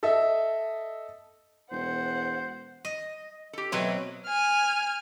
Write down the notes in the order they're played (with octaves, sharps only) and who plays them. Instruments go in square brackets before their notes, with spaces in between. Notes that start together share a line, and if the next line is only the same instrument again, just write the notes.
[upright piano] A4 D#5 E5
[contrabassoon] E1 [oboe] C5 [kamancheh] F#5
[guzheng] D#5
[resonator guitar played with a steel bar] G4 A4
[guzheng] B2 F#3 C4 [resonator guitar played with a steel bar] A3 B4 C#5
[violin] G#5 F6